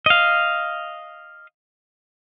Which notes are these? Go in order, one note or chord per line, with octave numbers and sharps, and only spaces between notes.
D#5 F5